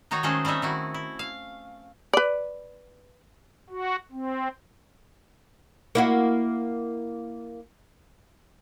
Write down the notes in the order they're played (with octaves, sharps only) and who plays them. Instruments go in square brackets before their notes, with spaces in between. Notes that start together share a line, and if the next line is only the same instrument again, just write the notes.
[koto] D#3 D#4 F#4 C#5 A#5
D#3 G#3 A3 C#4 G#4 C5
G3 C4 C#4 D#4 E5
D#3 E4 F#4
E4
F5
[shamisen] B4 D5
[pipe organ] F#4
C4
[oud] A#3 E4 F#4